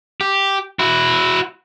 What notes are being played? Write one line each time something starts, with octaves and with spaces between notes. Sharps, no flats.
G4
E4 F#4